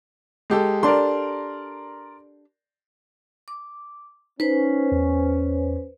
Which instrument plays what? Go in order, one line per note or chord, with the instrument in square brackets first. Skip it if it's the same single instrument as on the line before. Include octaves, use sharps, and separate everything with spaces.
[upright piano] G#3 G4 A4
[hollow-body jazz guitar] D4 G4 A4 [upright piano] A#4 D5 C6
[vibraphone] D6
[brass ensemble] C#4 [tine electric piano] D#4 [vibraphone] B4 C5
[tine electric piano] E2